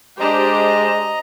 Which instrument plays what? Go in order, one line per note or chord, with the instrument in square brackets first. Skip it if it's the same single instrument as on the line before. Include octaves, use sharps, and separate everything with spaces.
[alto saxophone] G#3 [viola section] D4 G4 C5 [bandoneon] D#5 A#5